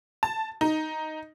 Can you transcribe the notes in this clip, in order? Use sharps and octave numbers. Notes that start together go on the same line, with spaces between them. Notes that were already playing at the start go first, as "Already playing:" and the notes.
A5
D#4